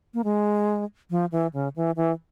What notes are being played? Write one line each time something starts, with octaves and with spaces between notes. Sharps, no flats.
A#3
G#3
F3
E3
C#3
E3
E3